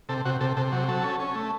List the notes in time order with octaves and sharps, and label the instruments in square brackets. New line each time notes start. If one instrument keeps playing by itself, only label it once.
[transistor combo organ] C3 A4
C3 F#4
C3 A4
C3 A4
F#3
F#3 A4
C#4
C#4
A3